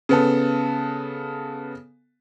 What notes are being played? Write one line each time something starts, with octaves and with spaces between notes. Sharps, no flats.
C#3 B3 A4